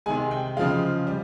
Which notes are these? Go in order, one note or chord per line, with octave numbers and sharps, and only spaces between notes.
C3 D#3 G#3 G#5
G5
C#3 F3 G#3 F5
G3